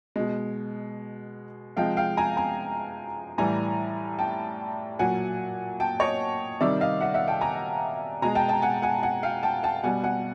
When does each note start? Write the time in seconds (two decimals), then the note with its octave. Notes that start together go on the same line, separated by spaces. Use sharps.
0.16 B2 G#3
1.76 C3 F3 G#3 F5 G5
1.97 F5 G5
2.17 G#5 A#5
2.37 G#5 A#5
3.38 A2 E3 G3 G#5 A#5
4.19 G5 A5
4.99 A#2 F#3 F#5 G#5
5.80 G5 A5
6.00 C#5 D#5
6.60 C3 D#3 G3 D5 E5
6.81 D#5 F5
7.01 E5 F#5
7.14 E5 F#5
7.28 G5 A5
7.41 G#5 A#5
8.22 B2 G#3 G#5 A#5
8.35 G5 A5
8.48 G5 A5
8.62 F#5 G#5
8.82 F#5 G#5
9.03 F#5 G#5
9.23 F5 G5
9.43 G5 A5
9.63 G5 A5
9.83 B2 G3 F#5 G#5
10.04 F#5 G#5